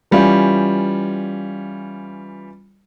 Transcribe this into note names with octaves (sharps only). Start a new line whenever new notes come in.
E3 G3 C#4 F4